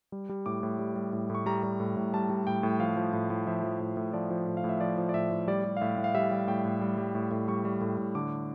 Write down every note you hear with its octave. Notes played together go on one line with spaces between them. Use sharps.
G3
G3
A2 D6
A2
G3
G3
A2
A2
C#6
G3 A#5
G3
A2
A2
G3 A5
G3
A2 G5
A2
F3 F5
F3
A2
A2
F3 E5
F3
A2
A2
F3 D5
F3
A2
F5
A2
E5
F3 D5
F3
D5
A2 E5
A2
G3 D5
G3
F5
A2 E5
A2
F5
G3 E5
G3
A2 G5
A2
G3
G3
A2
A2
G3 C#6
G3
A2
A2
D3 D6